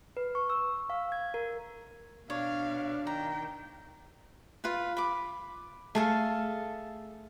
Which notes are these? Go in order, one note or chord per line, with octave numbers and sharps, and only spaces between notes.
B4
C#6
E6
F5
G#6
A#4
B2 D4 C#5 F5
D#3 G5 A#5
F4 B4
B5 D6
A3 G#4 A4 F5